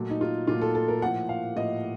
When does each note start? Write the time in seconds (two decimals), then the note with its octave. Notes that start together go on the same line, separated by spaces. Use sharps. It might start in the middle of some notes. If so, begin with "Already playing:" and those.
Already playing: A#2 F#3 A3
0.10 D#4
0.21 F4
0.47 A#2 F#3 A3 F4
0.61 A4
0.75 A4
0.88 A#4
1.02 A2 F3 A#3 F#5
1.29 F5
1.56 A2 F3 A#3 D#5